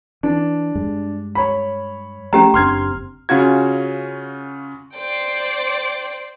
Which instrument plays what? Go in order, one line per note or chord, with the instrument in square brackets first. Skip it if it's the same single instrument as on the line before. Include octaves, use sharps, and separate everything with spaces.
[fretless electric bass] E3 [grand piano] D4
[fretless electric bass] G2 G#3
[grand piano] C#5 B5
[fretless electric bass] A3 [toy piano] C#4 G4 A#5
[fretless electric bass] F#1 C4 D4 [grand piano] C6 F6 G#6
[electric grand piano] C#3 C#4 F4 F#4 G#6
[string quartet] C5 D5 G5